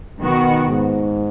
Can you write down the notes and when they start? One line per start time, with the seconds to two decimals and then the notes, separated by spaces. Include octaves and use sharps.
0.21 B2 D#3 B3 F#4
0.68 G#2